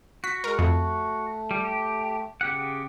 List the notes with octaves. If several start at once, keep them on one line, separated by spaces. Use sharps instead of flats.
F#4 B6
G#3 A#4
F2 A3
G3
G4
C#3 G4 F#5